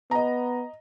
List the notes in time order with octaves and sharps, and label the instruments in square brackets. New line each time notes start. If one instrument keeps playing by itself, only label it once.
[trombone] B3 [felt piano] D#5 A#5